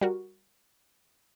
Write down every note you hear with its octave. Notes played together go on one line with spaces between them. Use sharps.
G3 F#4 A#4